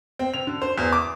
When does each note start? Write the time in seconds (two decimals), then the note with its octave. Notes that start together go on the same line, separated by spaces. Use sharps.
0.19 C4
0.34 F7
0.47 D3
0.62 C5
0.78 E2
0.93 D6